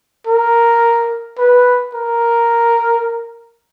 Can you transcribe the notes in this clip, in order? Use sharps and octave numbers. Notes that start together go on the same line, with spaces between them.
A#4
B4
A#4